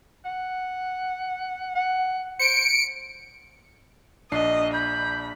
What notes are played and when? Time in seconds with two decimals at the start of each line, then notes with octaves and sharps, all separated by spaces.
0.25 F#5
1.75 F#5
2.39 C5 C#7 D7
4.32 A#1 D4 D#5 C7
4.74 B5 G6